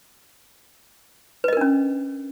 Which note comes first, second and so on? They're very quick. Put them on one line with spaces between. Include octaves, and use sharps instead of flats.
B4 D#5 A#4 D4 C#4